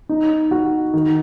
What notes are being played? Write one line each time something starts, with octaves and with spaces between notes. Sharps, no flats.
D#4
F#4
D#3